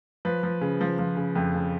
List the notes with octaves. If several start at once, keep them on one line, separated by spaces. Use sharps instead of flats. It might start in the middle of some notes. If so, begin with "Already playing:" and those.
F3 B4
F3
C#3
F3
F3
C#3
F2
C#3